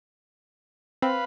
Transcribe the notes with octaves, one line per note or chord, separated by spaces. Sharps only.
C4 B4 F5 B5